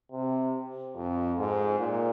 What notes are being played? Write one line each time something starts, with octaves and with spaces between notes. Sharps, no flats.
C3
F2
G#2
A#2